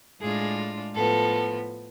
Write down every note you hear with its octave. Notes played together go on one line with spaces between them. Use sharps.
A2 G#3 D4 F4 G#4
A2 F3 B3 A4